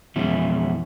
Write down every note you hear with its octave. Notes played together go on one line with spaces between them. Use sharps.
F2 B2 E3 G#3 C#4 E4